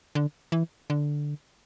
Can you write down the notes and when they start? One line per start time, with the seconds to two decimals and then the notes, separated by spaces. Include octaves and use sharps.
0.15 D3
0.52 E3
0.90 D3